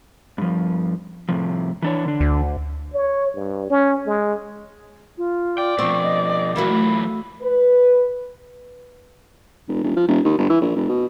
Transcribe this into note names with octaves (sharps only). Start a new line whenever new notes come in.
G2 F3
A2 C3 F3
E3 D4 C#5
D3 D4
D2
C#5
G2
C#4
G#3
F4
D5 G5
B2 F3 C4 C#6
D#5
D#5
E3 F#3 A3 A#3 F#4 B5
B4
F1
E1
F3
E1
D#2
G1
E3
A#1
F1
B2